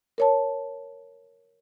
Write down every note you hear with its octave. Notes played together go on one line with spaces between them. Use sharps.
A#4 C#5 A5